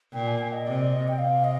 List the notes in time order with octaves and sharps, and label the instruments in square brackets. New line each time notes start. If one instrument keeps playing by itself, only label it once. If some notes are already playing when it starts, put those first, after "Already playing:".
[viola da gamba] A#2 [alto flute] G5
[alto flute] G#5
G5
D#5
[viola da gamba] C3 [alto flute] D5
[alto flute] D#5
G5
[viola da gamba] C3 [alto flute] F5
[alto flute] D#5